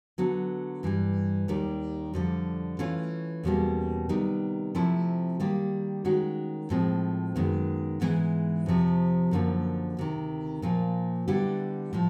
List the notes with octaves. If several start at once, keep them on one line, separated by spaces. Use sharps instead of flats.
D3 F#3 B3
G2 E3 G3
D#2 D#3 G3
F2 D3 G3
E3 A3 C#4 F4
E2 B2 G3 A#3 C#4
C3 D#3 G3 B3 D#4
C3 F3 A3 C4 E4
D#3 G3 A#3 D#4 G4
D#3 G#3 C#4 F#4
A2 F3 G#3 C4
F#2 D#3 G#3 B3
G#2 E3 G#3 B3 E4
F2 C3 F3
F#2 D3 F3 A#3
D2 C3 D#3
A#2 F3 A#3
D3 G3 B3 E4 G4
A2 F3